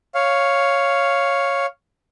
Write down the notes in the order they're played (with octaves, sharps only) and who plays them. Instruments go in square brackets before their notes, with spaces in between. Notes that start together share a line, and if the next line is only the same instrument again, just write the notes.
[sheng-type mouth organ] C#5 F5